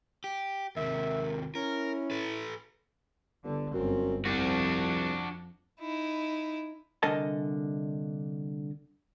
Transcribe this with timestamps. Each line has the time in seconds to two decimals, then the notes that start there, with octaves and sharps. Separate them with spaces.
0.24 G4
0.77 D#2 C3 A#4 E5
1.55 C#4 E4 A#4
2.11 A4 B4
3.44 G1 D3
3.74 G1 F#2 C4
4.25 C2 F2 F3 D4 F#4
5.80 D#4 E4
7.03 C2 D3 A#4 D#5 G#5 A5